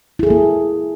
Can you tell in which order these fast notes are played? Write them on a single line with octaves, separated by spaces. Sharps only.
E4 G#4 A4 A#3